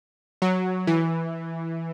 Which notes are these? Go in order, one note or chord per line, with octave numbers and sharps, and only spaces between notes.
F#3
E3